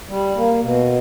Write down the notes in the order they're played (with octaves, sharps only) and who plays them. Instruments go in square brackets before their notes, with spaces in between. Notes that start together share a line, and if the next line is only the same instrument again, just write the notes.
[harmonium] G3
A#3
B2